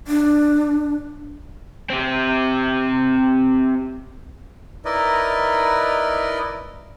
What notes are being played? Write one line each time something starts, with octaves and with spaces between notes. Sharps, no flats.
D4
C4 G4
D#4 E4 A#4 B4 D5 D#5